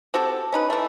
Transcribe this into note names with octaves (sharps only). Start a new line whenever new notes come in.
C4 F#4 G4 A4
C#4 D#4 B4
E3 A3